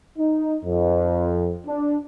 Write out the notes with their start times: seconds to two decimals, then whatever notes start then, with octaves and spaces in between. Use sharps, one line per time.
0.17 D#4
0.65 F2
1.66 D4